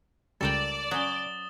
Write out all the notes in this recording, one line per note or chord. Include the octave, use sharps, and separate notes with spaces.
C#2 G3 A4 A#4 D5 G5 A6 E7
F#3 C#4 D#6 G7